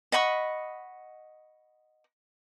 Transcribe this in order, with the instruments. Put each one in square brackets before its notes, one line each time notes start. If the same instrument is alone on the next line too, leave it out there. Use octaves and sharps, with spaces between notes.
[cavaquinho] D#5 F#5 B5 C#6